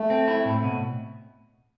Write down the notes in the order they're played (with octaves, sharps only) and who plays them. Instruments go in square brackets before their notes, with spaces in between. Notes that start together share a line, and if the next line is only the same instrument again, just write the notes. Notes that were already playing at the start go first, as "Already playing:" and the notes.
Already playing: [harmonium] A3
[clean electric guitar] C4
E4
A2
B2